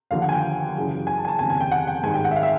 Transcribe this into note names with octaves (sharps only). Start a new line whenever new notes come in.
D#2 D3 F3 F5
F#5
G#5
G5
F#2 C#3 E3
G#5
A5
G#5
A5
F1 D#2 C#3 G#5
G#5
G5
F#5
G5
G#2 D#3 G3 G#5
G5
F#5
E5
F5
E5